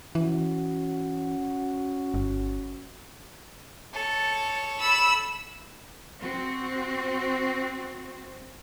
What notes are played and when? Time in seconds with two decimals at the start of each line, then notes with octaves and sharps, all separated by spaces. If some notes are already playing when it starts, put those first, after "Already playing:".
0.15 E3 C#4 F#4
2.14 G1
3.94 A4 C#5
4.78 B5 E6
6.21 C4 F#4